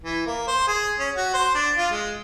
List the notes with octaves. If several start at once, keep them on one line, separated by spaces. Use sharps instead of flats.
E3
A#3
C5
G#4
C#4
F#4
C5
D4
F4
G#3